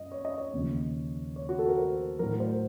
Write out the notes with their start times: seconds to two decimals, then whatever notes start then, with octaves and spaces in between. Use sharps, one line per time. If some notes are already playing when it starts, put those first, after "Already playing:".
Already playing: F#2 D#5
0.12 C#5
0.25 D#5
0.38 C#5
0.53 D#2 C#3 F3
1.36 C#5
1.49 F#4
1.59 A4
1.68 A#4
1.78 C5
2.19 A2 F#3 A#4
2.40 C5